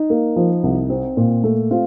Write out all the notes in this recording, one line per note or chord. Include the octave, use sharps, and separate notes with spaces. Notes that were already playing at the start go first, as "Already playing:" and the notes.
Already playing: D#4
A#3
F3
C2
C4
A#2
A3
C4 F4